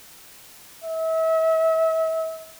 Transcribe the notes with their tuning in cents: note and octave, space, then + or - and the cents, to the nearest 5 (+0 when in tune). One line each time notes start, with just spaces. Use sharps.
E5 -35